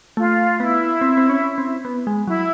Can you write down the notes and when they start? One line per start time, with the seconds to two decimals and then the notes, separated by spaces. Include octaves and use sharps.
0.17 A3 F4
0.60 B3 E4
1.01 C4
1.17 C4
1.29 C#4
1.58 C4
1.85 B3
2.07 G#3
2.27 F#3 E4